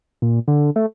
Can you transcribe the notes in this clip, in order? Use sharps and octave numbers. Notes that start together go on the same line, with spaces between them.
A#2
D3
A3